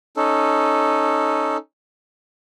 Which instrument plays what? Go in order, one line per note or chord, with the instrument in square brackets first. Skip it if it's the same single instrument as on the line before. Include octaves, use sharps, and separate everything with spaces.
[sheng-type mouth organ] C#4 D#4 A4